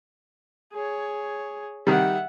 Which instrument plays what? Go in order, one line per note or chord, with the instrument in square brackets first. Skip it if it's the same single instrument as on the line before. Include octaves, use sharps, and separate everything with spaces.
[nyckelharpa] G#4 C#5
[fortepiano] D#3 G3 [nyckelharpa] E5 F#5